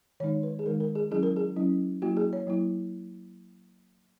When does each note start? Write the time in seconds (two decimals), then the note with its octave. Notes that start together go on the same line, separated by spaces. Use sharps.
0.20 D#3 G#3 D#4 C#5
0.43 B4
0.59 G#4
0.66 D#3 G#3 D#4 A#4
0.80 A#4
0.95 G#4
1.11 F#3 C#4 E4 G#4
1.23 A#4
1.36 G#4
1.56 F#3 C#4 E4
2.02 F#3 A#3 E4 F#4
2.17 G#4
2.33 C#5
2.47 F#3 A#3 E4